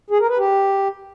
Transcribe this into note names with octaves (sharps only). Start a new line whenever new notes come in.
G#4
A#4
B4
G4